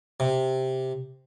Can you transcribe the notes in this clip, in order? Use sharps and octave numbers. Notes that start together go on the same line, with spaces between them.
C3